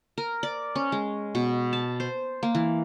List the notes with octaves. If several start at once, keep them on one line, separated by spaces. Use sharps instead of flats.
A#4
D5
C#4
G#3
B2
A5
C5
A#3
E3